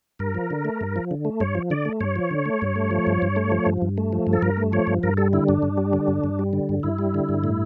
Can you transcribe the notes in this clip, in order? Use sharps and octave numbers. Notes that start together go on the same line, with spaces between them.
G2 A#4
F3
D3
A3
G2
F3
D3
A3
G2 C#5
F3
D3 D5
A3
G2 C#5
F3
D3
A3
G2
A3
F3
G2
G2
A3
F3
G2
G2
A3
F3
G2
A4
G2 A#4
A3
F3 C#5
G2
G2 A#4
G3 A4
D3 E4
G2 D4
G2
G3
D3
G2
G2
G3
D3
G2
G2 E4
G3
D3
G2
A2